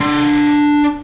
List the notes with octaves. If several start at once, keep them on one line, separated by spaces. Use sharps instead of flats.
D4 C6